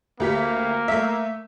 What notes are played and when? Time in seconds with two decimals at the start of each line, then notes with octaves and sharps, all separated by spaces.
0.20 D2 A#3 G4 B6
0.88 A3 E5